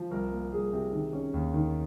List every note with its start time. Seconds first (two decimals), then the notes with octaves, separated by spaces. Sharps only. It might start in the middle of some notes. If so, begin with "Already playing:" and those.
Already playing: F3
0.11 C2 A#4
0.32 A#3
0.53 C2 G#4
0.73 C3
0.93 D#3
1.13 C#4
1.34 D#2
1.54 D#3